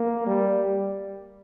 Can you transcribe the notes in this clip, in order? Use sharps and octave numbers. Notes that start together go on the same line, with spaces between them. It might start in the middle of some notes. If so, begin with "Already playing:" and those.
Already playing: A#3
G3